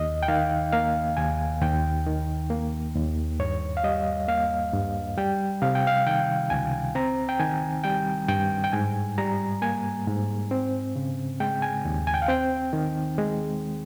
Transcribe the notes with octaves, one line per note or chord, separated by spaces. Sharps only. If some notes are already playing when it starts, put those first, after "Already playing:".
Already playing: D#2 D#5
G5
D#3 F5
A#3 F5
D#2 G#5
D#2 G5
D#3
A#3
D#2
G2 C#5
F5
G3 D#5
A#3 F5
G2
G3 G5
C3 F5
G5
F5
D#3 G5
C#2 G#5
C4 A#5
G5
D#3 G#5
G3 G5
G2 G5
G5
G#2 G#5
G3 A#5
A#3 G#5
G#2
C4
C#3
G#3 G5
G#5
D#2
G#5
G5
F5
C4 G5
D#3
G#3